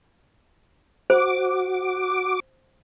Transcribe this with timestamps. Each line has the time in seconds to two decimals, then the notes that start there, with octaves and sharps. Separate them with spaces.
1.10 F#4 C5 D6